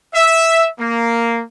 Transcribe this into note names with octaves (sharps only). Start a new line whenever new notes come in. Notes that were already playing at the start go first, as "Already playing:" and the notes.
E5
A#3